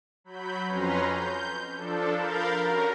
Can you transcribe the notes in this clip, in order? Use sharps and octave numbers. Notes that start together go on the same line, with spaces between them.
F#3 B5 G6
F2 C#4 B4 A#5 C6
G6
F3 D4 A4
A#4 F5 B5 G6 A6
C#4 F#4 A#4